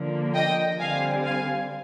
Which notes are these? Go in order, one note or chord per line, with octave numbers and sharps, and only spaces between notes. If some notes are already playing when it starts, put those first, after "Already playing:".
Already playing: D3 F3 A#3
D#5 G5
D3 G3 C4 F5 G#5
F5 G#5